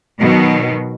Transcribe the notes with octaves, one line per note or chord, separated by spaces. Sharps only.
B2 D#3 F#3